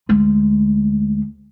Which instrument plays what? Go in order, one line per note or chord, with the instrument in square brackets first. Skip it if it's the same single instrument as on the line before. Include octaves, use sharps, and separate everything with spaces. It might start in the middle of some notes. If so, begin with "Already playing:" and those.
[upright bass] D2 G#3